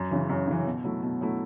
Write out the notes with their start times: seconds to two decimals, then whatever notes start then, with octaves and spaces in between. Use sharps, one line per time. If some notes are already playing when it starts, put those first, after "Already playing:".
Already playing: F#2
0.11 C#3 E3
0.29 F#2
0.48 C#3 E3
0.66 B2
0.84 F#3 A3 E4
1.02 B2
1.21 F#3 A3 E4